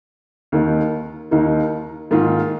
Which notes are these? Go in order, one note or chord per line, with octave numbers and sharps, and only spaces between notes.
D#2 D#3 A#3 D#4
D#2 D#3 A#3 D#4
G#2 D#3 A#3 F4